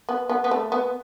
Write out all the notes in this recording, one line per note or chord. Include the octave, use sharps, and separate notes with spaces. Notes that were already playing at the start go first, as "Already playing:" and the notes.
B3
B3
B3
A3
B3